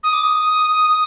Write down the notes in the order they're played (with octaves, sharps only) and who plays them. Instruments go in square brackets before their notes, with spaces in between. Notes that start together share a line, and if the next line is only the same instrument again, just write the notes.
[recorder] D#6
D6
D#6